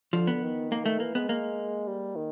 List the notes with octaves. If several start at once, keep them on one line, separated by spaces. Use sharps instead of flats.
D3 F3
B3
D#3
A#3
A3
E3 A#3
G#3 B3
A#3
G3
D#3